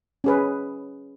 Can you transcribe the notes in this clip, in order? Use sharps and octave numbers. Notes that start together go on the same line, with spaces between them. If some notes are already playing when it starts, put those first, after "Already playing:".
C#4 G#4 B4